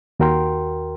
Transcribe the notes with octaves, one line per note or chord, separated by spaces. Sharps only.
D#2 F#4 A#4 G5 C6